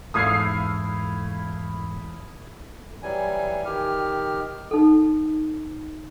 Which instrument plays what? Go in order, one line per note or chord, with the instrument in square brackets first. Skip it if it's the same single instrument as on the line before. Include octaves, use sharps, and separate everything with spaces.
[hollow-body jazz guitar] E2 G#2 [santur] A3 E4 F5 [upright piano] D#6 G#6 C7
[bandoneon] E3 F#3 G3 G#5
D#3 G4 F6
[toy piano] D#4 A4